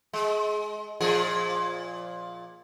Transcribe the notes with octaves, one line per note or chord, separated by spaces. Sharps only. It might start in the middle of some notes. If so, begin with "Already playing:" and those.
G#3
A#2 F3 G#4